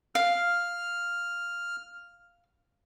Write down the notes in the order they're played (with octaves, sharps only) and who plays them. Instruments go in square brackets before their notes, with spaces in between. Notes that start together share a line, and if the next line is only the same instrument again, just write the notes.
[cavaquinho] F5 [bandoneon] F6